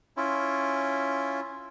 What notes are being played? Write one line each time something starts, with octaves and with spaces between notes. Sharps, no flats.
C#4 E4 F4